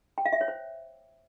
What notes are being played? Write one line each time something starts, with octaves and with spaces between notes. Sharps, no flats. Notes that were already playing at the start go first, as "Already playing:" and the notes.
G5
F5
E5
C#5
C5